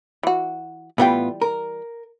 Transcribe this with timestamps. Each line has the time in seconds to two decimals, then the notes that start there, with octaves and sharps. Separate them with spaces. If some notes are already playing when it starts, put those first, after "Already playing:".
0.23 E3 F#4
0.98 A2 E3 G3 B3 F4 G5
1.42 A#4